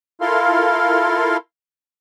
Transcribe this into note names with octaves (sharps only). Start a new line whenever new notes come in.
E4 F4 A4 A#4 F5 C6